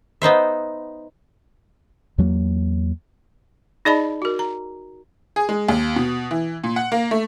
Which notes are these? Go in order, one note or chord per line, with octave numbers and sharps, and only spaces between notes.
B3 D#4 C5 E5
E2 F#3 G#3 A#3
D#4 G#4 D5 D#5 A5 B5
F#4 A#4
A#5
G#4
G#3
D#2
B2
E3
A#2
F#5
A#3
A3